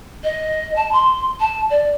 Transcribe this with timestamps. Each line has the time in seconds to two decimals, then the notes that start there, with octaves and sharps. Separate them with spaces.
0.23 D#5
0.75 A5
0.92 C6
1.40 A5
1.70 D5